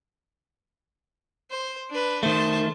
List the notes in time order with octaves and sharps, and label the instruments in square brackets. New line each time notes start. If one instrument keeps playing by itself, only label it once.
[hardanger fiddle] C5
D4 B4
[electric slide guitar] D#3 A3 [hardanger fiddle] C5 A5